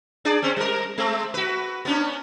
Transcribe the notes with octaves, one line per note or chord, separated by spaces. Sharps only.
D4 G#4 D5
C4 C#4 C5
G3 A#4
G#3 A3 C4
F#4 B4
B3 C#4 D4